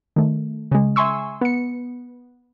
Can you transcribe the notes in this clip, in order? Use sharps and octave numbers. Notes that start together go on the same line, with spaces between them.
D#3 A3
C#3 G#3
E5 G#5 C6 C#6 E6
B3 C#7